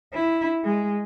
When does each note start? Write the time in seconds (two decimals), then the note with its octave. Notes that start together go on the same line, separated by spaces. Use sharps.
0.14 E4
0.64 G#3